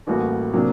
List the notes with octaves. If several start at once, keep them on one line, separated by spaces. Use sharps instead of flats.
A1 A2 G3 A#3 F#4
C3 F#3 A#3 D4